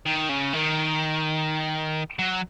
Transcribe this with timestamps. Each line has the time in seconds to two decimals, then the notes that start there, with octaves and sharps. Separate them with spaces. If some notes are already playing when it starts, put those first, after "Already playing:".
0.06 D#3
0.29 C#3
0.53 D#3
2.19 F#3